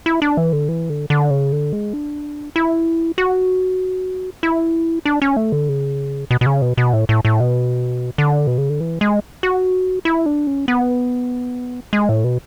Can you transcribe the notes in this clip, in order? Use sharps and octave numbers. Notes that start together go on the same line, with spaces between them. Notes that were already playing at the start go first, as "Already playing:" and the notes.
E4
D4
E3
D3
E3
D3
D3
C#3
D3
G#3
D4
E4
F#4
E4
D4
C#4
A3
D3
C#3
B2
B2
C#3
B2
B2
A2
A2
A2
B2
D3
B2
C#3
D3
E3
G#3
F#4
E4
D4
C#4
B3
G#3
A2
B2